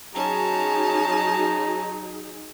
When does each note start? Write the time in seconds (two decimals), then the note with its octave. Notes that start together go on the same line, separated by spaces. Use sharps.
0.15 F#3 C#4 D#4 G#4 A5 A#5